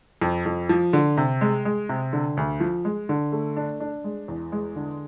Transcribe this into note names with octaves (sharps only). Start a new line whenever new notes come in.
F2
F2
F3
D3
C3
G#3
G#3
C3
D3
D2
F3
G#3
D3
A3
D4
D4
G#3
E2
G#3
D3